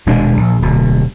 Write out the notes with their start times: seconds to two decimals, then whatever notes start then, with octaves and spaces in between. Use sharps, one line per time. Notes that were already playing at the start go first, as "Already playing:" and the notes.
0.06 D#1 B2 G#3 D4
0.37 A#1
0.62 D1 B2